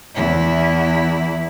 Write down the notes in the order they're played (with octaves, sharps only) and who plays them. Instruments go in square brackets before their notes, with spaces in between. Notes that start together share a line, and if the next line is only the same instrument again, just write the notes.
[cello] E2 E4